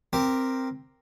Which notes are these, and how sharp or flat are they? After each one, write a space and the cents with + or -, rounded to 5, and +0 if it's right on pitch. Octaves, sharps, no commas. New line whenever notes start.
C4 +0 G4 +0 A#4 +0